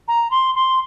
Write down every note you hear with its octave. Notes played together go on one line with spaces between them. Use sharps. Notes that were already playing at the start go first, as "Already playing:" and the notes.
A#5
C6
C6